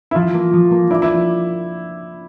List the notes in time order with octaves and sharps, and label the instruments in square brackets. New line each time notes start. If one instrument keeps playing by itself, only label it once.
[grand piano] E4
[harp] F3 [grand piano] F4
[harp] A#3
F3
A#3
[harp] D4 [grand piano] E4
[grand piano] E4